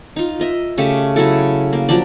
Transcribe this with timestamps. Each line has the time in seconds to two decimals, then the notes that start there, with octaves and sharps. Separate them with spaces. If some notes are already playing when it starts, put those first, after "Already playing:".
0.16 D#4 F4
0.40 A#4 D#5 E5
0.78 C#3 A3 G4
1.16 C#3 F#3 E4 A4
1.73 A#3
1.89 F3 F#3 D4 D5